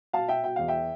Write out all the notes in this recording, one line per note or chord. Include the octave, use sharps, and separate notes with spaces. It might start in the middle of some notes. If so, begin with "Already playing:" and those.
B2 F5 A5
B2 E5 G5
B2 G5
E2 F5
E5 G5